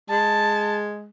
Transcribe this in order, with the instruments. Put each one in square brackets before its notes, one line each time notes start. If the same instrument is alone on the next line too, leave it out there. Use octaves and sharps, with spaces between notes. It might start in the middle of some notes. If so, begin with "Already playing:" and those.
[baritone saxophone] G#3 [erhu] A5